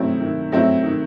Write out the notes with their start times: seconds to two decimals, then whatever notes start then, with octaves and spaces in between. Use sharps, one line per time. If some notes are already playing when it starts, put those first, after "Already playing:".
Already playing: D#3 F#3 A3 C4 E4
0.20 D#3
0.52 F#3 A3 C4 E4
0.83 D#3